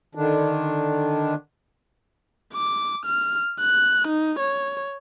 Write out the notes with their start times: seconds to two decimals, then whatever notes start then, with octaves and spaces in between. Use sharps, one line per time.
0.15 D3 D#3 D4
2.54 D6
3.06 F6
3.61 F#6
4.08 D#4
4.39 C#5